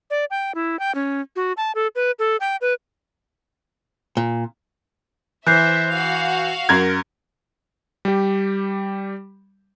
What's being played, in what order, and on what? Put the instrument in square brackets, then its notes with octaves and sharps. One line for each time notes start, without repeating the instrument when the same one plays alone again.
[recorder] D5
G5
E4
G5
C#4
F#4
A5
A4
B4
A4
G5
B4
[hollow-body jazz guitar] A#2
[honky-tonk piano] E3 [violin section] C5 E5 [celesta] F#6 G6 C7
[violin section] F#4 F5
[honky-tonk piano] F#2 A#4 G#6
[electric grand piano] G3 G4